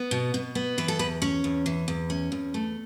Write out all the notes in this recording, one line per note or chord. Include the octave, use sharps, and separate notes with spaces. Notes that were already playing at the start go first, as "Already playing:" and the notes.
Already playing: B3
B2
B2
B3
E3 B4
A4
E2 B4
C#4 C#5
E2
E3
E2
C#4
E2
A3